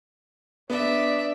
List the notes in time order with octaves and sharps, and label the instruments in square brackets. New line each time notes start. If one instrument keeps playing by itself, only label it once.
[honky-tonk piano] B3 [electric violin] D4 D5 [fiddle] E5